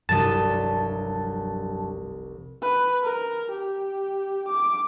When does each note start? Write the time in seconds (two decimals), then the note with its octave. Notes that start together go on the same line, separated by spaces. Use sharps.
0.09 F1 C2 G2 F#3 A5 D#6
2.63 B4
3.03 A#4
3.52 G4
4.48 D6